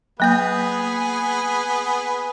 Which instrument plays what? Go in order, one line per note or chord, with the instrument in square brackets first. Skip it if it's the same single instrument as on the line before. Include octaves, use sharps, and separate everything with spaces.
[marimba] F#3 A#3 G6 [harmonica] B3 G#4 B4